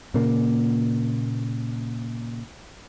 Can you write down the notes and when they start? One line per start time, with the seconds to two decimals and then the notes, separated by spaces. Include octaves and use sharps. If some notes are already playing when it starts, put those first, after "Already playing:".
0.14 A#2 C#3 A#3